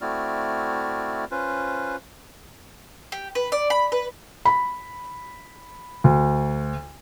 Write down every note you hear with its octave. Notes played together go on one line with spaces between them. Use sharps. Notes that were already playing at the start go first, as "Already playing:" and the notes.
A3 C4 E4 F#4 D5 F6
C#4 F4 B4 C5
G4
B4
D5
B5
B4
B5
D2